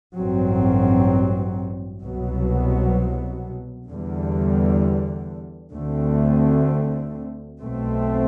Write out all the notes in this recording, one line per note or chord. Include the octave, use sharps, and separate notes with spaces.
A1 G2 F#3 C4
C2 B2 F#3 B3
E2 D3 G3
D2 D3 A3 C4
B1 B2 A3 C4